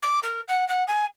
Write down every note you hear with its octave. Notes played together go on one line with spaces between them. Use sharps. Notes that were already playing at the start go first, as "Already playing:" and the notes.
D6
A#4
F#5
F#5
G#5